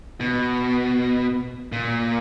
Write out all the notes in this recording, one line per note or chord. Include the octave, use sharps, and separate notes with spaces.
B2
A#2